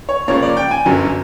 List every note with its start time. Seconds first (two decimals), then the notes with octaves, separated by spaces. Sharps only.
0.09 C#5
0.28 C#2 C#3 F3 A#3 C#5
0.42 D5
0.57 G5
0.71 G#5
0.86 G1 F#2 D3 F#3